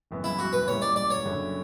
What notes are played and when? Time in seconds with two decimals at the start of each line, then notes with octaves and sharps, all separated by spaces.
0.11 F#1 F#2 E3 B3
0.24 E4
0.39 F#4
0.53 B4
0.67 A#2 G3 A#3 E4 A#4 C#5
0.82 D5
0.96 D5
1.10 C#5
1.24 F#1 F#2 D3 F#3